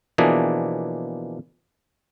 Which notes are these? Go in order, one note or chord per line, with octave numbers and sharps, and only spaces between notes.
B2 E3 F3 A#3 D4 G#4